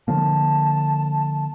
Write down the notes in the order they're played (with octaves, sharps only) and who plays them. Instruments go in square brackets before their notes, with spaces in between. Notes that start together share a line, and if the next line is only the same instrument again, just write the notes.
[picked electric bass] D3 F3 A#3 [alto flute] A5